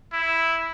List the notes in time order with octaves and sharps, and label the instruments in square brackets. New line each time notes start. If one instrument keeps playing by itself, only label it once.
[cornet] E4